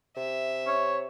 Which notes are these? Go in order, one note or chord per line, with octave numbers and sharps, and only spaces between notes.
C3 E5
C#5